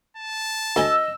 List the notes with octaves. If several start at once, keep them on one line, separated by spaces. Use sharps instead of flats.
A5
D2 D#5 G#5 E6